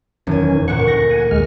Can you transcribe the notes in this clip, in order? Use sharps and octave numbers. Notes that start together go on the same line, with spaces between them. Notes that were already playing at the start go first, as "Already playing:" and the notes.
E1 F#2 D#3 C#4 G#5
D2 A#2 F#5 C#6
A#6
F#5 G#5
D2 G#3 F6